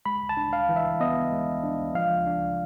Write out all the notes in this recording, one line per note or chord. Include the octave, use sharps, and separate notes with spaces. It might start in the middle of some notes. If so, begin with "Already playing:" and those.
G#3 B5
A5
D4
F5
E3
E5
B3 D#5
G#3
D4
F3 F5
D4